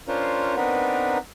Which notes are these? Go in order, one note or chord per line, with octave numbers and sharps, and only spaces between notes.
C#4 D4 F4 A#4 C5
B3 C4 D4 D#4 A#4 B4